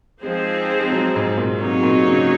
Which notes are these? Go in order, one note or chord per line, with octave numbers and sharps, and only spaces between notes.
F3 G#3 C4 D#4 G#4 C5
G#3
F#3
G#2
A#2
C3 F#3 A#3 D#4 G#4 C#5
C3
A#2
C#3